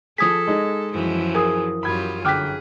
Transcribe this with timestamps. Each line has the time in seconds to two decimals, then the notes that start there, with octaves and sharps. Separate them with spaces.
0.18 F3 G#4 A4 D#6 G#6 B6
0.47 G#3 D#4
0.93 F#2 E3 F3
1.35 G#4 A#4 D#6
1.83 F#2 F4 G4 B5 G#6
2.25 G1 G#4 G5 D6 F6 F#6 B6